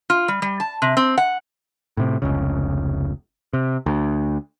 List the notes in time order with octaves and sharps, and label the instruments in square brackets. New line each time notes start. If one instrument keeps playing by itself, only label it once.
[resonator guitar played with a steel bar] F4
G3
G3
A5
C3
C4
F#5
[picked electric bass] A2 C3
F1 C#2 C#3
C3
D2